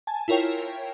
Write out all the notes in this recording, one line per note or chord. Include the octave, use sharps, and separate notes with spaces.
G#5 A5
E4 F4 A#4 C#5 G5